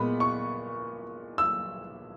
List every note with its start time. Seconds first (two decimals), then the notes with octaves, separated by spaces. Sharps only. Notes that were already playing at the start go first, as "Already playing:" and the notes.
Already playing: A#2 G#3 B3 B5
0.20 C#6
1.38 E6